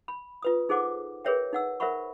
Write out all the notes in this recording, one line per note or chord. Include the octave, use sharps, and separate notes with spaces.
B5
F4 B4 D#6
D#4 G#4 A4 C5 F#5 D6
G#4 A#4 B4 C#5 E5 G5
D#4 F#5 E6
A#4 C5 E5 F#5 B5 C#6